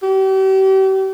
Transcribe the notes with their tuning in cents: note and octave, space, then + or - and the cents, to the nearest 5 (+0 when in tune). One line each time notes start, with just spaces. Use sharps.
G4 -40